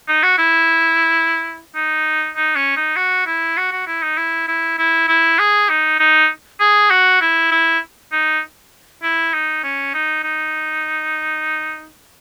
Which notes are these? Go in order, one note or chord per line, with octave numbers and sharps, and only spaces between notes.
D#4
F#4
E4
D#4
D#4
C#4
D#4
F#4
E4
F#4
F#4
E4
D#4
E4
E4
E4
E4
G#4
D#4
D#4
G#4
F#4
E4
E4
D#4
E4
D#4
C#4
D#4
D#4